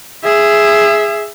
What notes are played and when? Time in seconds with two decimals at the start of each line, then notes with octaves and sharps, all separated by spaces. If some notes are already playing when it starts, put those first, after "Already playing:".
0.24 G#4 E5